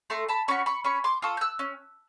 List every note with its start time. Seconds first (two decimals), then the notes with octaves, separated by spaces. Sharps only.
0.10 A3 A#5 C6
0.29 A5 B5
0.48 C#4 F#4 B5 C#6
0.66 B5 C#6
0.84 C#4 B5 C#6
1.04 C6 D6
1.22 F4 A4 C#6 D#6
1.37 G6
1.41 E6 F#6
1.59 C#4